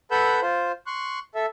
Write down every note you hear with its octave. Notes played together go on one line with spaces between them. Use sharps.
A4 B4 F#5 B5 E6 G6
F4 C5
C6 C#6 F#6
A4 E5